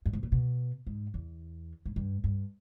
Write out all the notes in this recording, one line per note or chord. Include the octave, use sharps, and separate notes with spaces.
G2
G#2
A#2
B2
G#2
E2
G#2
G2
G2